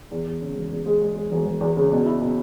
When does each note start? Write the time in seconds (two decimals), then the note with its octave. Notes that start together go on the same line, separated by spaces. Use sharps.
0.11 E2
0.27 E2
0.42 C#3
0.56 E1
0.71 E2
0.86 G#3
1.02 G#3
1.16 G#3
1.32 E1
1.46 E1
1.61 E2
1.77 C#3
1.92 B2
2.06 E4
2.21 B2